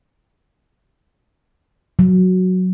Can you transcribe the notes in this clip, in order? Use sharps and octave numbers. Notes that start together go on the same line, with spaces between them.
F#3